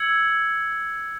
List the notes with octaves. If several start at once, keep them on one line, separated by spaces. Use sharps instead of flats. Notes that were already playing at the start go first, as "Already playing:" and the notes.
Already playing: E6 G#6 C#7 F#7